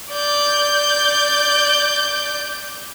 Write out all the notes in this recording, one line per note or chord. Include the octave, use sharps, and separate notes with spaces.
D5 G6